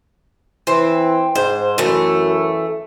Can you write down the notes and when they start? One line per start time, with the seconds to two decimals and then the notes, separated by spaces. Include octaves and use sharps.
0.67 E3 C4
1.35 G#2 C5
1.78 F#2 E3 A3